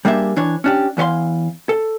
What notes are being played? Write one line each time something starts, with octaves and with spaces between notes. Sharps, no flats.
G3 A#3 D4 G#4 E5
E3 D4 C#5
C#4 D4 G4
E2 E3 C#5 F5 C6
A4